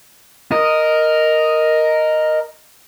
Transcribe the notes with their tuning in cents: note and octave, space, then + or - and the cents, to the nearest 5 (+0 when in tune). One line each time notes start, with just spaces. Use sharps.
A#4 +0 D#5 +0